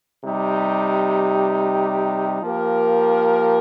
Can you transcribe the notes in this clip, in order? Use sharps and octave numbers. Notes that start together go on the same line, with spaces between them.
C3 G3 D#4 G4
F3 A#3 G4 A#4